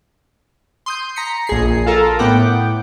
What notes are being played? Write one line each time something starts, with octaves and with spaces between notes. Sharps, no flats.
C6 D#6 G6
A#5 B6 C#7
A#1 G#4 C7
F4 A4 A#4
A2 B3 F#5 G5 D6